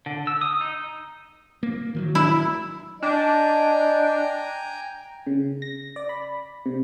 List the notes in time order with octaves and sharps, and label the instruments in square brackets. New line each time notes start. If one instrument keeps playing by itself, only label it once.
[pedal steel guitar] D3
E6
D#6
D#4
[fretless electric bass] A#3
D#3 E3 F#3
[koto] E4
[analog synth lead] D4 [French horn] D#5 [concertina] G5 G#5 A#5
[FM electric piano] C#3
A#6
D5
B5
C3